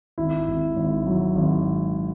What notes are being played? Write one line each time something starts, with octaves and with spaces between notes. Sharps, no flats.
G#1 E4
G#1
G#1
F#3
G#1